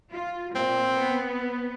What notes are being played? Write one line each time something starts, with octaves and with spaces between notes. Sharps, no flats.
F4
A#2 C4
B3